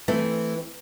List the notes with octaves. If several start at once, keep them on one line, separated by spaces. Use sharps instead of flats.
E3 A3 C4